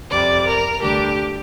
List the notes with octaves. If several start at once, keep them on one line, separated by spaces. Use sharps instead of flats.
F2 C3 G3 D5
A#4
D2 D3 G3 D4 G4